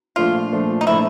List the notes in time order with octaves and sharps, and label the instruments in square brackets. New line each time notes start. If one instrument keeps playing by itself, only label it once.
[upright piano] A#2 F3 A3 D4 [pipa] F4
[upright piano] A#2 F3 A3 D4
[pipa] D#4
[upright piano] A#2 F3 A3 D4 [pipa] E4